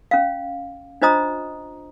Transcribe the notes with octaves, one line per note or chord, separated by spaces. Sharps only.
C#4 F5
D4 F4 C5 D#5 A#5 D#6